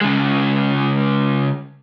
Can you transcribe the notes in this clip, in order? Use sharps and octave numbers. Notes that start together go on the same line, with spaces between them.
C#3 G#3